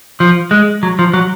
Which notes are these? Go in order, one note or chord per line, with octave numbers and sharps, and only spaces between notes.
F3
G#3
F#3
F3
F#3